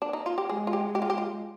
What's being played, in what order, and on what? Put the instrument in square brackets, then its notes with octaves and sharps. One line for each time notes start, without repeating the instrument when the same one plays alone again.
[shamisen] D4
D#4
F4
G4
[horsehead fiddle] G#3 [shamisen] G#4
[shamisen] F4
G4
G4
F4
G4
F4